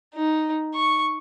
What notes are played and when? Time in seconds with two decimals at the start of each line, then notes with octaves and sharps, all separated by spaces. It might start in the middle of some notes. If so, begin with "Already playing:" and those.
0.14 D#4
0.74 C#6